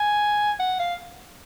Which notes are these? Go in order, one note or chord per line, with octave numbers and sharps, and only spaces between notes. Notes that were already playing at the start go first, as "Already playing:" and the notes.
Already playing: G#5
F#5
F5